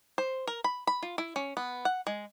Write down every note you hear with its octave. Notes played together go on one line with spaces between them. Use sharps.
C5
A#4
B5
B5
F4
E4
C#4
B3
F#5
G#3